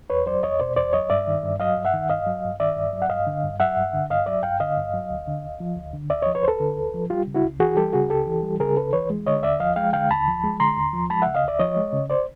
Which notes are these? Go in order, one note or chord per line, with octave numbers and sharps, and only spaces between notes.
E2 B4 C#5
F#3 C5 D5
E2 C#5 D#5
B2 C5 D5
E2 C5 D5
F#3 C#5 D#5
G2 D5 E5
D#3
G2
F#3 D#5 F5
G2
E5 F#5
D#3
G2 D#5 F5
F#3
G2
D#3 D5 E5
G2
F#3
F#5
G2 D#5 F5
D3
G2
F#3 E5 F#5
G2
D3
G2 D#5 F5
F#3 D5 E5
G2 F5 G5
D3 D#5 F5
G2
F#3
D2
D3
D2
F3
D2
D3
D2 D5 E5
F3 C#5 D#5
B4 C#5
D2 A4 B4 C5
D3
D2
F3
G3 F4 G4
C#3
E4 F#4
C#2
E3 F#4 G#4
G3 G4 A4
C#3 F#4 G#4
C#2 G4 A4
E3
G3
C#3 G#4 A#4
C#2 A4 B4
E3 B4 C#5
G#3
D3 C#5 D#5
D#2 D5 E5
F3 D#5 F5
G#3 F5 G5
D3 F5 G5
D#2 A5 B5
F3
G#3
D3 A#5 C6
D#2
F3
G#3 A5 B5
C#3 E5 F#5
D#5 F5
D2 D5 E5
F3 C#5 D#5
G#3
C#3
C5 D5